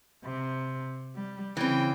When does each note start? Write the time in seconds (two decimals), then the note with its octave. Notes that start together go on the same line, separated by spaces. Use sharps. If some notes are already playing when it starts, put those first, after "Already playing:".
0.24 C3
1.14 G3
1.57 C#3 E3 C4 G5